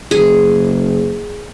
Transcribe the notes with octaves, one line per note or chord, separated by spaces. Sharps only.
F#1 G#4